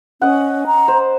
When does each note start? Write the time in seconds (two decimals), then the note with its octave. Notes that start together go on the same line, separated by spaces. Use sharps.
0.22 C#4 D#5 F#5
0.66 A#5
0.88 C5